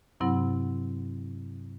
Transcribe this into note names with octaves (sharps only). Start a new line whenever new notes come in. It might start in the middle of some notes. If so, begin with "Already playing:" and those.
G2 C3 F#3 C4 E4 F#5